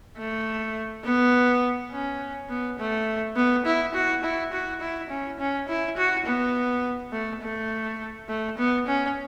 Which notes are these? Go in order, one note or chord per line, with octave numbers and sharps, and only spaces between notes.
A3
B3
C#4
B3
A3
B3
E4
F#4
E4
F#4
E4
C#4
C#4
E4
F#4
B3
A3
A3
A3
B3
C#4